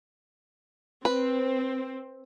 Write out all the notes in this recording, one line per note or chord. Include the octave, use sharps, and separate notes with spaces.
C4 B4